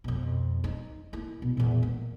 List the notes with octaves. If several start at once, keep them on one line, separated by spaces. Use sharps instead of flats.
F2 B2
D#4
A#3 E4
B2
E2 A#2
A#3